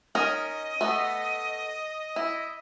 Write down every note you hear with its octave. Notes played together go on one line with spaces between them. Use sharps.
C#4 D#4 A#4 D#5
A3 B3
E4